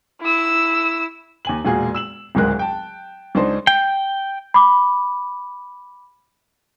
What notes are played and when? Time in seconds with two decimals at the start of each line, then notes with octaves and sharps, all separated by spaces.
0.21 E4 E6
1.45 D#2 G#5 F#7
1.65 E1 A#2 F4 F#4 G#4
1.95 E6 E7 F#7
2.35 D1 G#1 C#2 G#3 A#4 F#6
2.59 G5 A5
3.35 C#2 D4 D#4 C5
3.67 G5
4.54 B5 D6